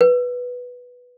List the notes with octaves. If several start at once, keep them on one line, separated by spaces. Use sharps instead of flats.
B4